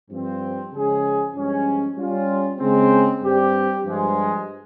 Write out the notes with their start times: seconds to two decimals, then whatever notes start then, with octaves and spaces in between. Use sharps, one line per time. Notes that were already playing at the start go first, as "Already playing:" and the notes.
0.10 G2 F3 C4
0.71 C#3 F3 G#3 C#4 G#4
1.33 G2 F3 G#3 C#4
1.96 G3 C#4 F4
2.57 C#3 G#3 C4
3.21 G2 G3 C4 G4
3.83 G2 F3 G#3